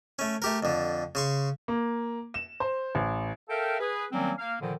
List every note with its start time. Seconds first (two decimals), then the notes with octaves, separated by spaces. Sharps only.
0.19 A3 C#4
0.42 A3 G4 A#4
0.63 F2 D3
1.15 C#3 C6 C#6
1.68 A#3
2.34 E7
2.60 C5
2.95 A1
3.49 A4 A#4 E5 F5 G5
3.80 G#4 B4
4.11 D#3 F#3 G3 A#3 C4 C#4
4.37 A#3 F5
4.61 A#2 D3 D#3 F3